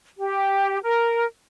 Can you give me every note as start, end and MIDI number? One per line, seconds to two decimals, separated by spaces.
0.19 0.79 67
0.83 1.25 70